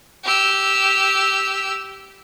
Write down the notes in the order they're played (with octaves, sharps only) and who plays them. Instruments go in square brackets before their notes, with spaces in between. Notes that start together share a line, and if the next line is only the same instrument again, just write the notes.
[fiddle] G4 E6